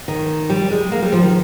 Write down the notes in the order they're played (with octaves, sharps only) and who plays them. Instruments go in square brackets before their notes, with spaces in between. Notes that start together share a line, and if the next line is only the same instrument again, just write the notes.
[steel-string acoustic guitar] D#3
G3
G#3
A#3
G3
F3
D#3